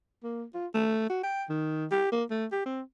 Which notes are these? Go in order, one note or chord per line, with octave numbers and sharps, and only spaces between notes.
A#3
F4
A3
F#4
G5
D#3
G4
A#3
A3
G4
C4